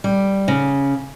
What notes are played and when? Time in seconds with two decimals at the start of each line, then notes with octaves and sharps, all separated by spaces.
0.04 G3
0.48 C#3